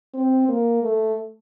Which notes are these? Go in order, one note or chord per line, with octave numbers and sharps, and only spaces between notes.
C4
A#3
A3